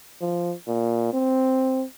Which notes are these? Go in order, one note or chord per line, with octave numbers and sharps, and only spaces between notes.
F3
A#2
C4